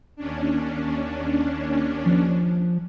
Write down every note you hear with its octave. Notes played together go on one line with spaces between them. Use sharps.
D#2 C#4 D4
F3